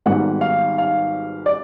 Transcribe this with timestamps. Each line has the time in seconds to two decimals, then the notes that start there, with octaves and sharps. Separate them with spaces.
0.06 G#1 G#2 D#3 G3 B3 F#5
0.41 F5
0.78 F5
1.46 D5